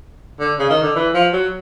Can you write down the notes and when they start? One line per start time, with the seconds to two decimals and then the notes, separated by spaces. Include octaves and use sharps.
0.40 D3
0.59 C#3
0.70 D#3
0.83 D3
0.96 E3
1.14 F3
1.33 F#3